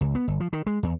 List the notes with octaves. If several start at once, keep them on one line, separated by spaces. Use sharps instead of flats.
C#2
B3
G1
F3
D#3
G#3
E2